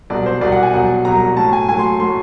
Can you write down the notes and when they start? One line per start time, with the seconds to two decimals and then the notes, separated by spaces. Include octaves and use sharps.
0.10 C2 B2 F#3 D5
0.26 C5
0.41 C2 B2 F#3 D5
0.52 F#5
0.63 G#5
0.73 C2 B2 F#3 F#5
1.05 C2 B2 F#3 A#5
1.37 A2 F#3 A5
1.53 G#5
1.68 A2 G#5
1.73 F#3
1.79 C6
2.00 A2 F#3 C6